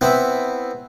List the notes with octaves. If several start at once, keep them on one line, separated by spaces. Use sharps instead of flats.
B3 C4 E4